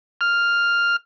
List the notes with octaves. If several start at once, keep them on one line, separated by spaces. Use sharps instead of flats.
F6